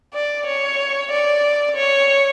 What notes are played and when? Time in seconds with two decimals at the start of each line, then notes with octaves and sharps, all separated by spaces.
0.14 D5
0.47 C#5
1.11 D5
1.76 C#5